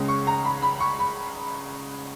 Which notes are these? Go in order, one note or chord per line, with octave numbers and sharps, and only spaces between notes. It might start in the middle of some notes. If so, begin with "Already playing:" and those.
Already playing: C#2 C#3 G#3 C#4
C#6
A#5
B5
B5
C#6
B5